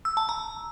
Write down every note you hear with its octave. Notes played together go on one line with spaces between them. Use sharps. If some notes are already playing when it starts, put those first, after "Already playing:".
E6
A5
A#5